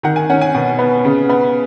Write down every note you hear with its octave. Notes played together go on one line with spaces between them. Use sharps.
D#3 F#5
G#5
C#4 F#5
G#5
B2 F#5
B3
C#3
B3